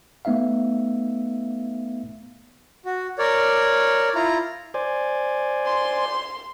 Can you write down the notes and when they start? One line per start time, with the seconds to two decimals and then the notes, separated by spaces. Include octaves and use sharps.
0.25 A3 B3 D#4 E5 F5
2.85 F#4
3.19 A#4 C#5 D5
4.15 E4 F4 A#5
4.74 C5 D5 G#5
5.65 C6